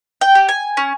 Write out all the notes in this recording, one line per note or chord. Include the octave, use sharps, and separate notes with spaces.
G5
G4
G#5
C#4